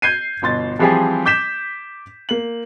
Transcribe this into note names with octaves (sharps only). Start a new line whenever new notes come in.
G6 G#6 C7 D#7
G1 B2 C6 A6
E3 F3 G3 C4 G4 G#4
D6 G6 B6 E7
A#3 F#7